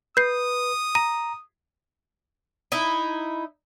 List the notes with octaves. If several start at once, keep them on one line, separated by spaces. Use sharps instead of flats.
B4 D#6 G6 C7
A#5 D#7
D#4 E4